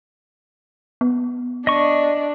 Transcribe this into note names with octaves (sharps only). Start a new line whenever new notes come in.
B3
D4 D#5 C#6